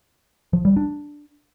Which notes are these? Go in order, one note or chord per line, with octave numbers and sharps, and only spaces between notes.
F3
G3
D4